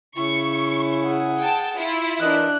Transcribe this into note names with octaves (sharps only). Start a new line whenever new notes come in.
C#3 E4 C#6
G#4 F#5
G5 A5
E4 F4
E3 D4 A#4 D#5 F#6